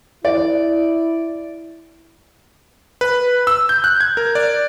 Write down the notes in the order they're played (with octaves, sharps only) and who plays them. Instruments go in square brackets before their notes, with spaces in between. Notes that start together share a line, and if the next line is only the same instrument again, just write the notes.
[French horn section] E4 [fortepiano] D5
[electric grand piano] B4
E6
G6
F#6
G#6
A#4
D5